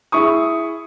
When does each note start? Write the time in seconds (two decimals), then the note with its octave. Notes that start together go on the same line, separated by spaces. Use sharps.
0.12 E4 G#4 C#6 D#6